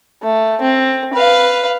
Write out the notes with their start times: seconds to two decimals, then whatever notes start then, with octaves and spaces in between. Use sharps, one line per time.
0.23 A3
0.61 C4
1.14 B4 F5